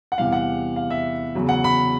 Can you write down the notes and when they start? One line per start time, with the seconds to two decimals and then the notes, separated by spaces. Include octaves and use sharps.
0.12 F#5
0.18 E2 C3 E3 G3 F5
0.32 F#5
0.76 F5
0.90 E5
1.35 E2 C#3 F#3
1.49 F#5
1.64 B5